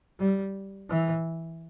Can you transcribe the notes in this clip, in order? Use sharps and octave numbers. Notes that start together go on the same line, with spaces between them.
G3
E3